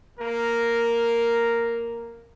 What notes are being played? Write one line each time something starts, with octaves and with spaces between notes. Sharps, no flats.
A#3 A#4